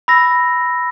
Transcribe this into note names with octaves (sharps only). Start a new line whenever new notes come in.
B5 E6 A#6